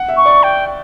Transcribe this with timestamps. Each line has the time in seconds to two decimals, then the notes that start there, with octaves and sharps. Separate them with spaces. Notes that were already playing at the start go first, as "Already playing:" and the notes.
Already playing: F#5
0.08 E5
0.17 C#6
0.26 D5
0.43 G5